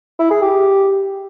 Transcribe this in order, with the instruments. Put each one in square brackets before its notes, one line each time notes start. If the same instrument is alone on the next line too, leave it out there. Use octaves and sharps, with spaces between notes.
[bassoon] E4
G#4
G4